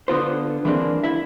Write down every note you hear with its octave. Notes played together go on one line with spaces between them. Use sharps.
D3 B3 F4 C5
E3 G#3 A#3 C4 D4
E4 E5